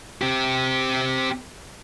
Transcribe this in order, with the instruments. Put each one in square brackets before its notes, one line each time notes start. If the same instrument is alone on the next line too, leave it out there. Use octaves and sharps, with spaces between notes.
[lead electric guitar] C4 G4